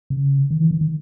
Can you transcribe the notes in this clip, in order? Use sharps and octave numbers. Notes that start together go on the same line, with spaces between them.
C#3
D#3
E3
D#3
D#3